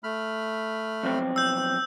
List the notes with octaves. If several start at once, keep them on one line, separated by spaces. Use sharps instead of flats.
A3 B5 F6
B1 F2 C4
E6 G6